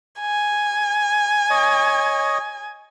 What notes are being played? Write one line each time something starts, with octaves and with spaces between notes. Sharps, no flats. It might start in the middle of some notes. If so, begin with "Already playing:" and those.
G#5
C#5 D#5